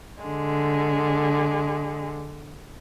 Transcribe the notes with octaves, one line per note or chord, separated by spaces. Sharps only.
D3 G#3